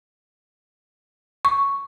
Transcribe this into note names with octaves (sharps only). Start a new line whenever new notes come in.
C#6